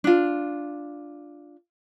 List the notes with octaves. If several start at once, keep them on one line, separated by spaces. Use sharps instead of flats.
D4 F4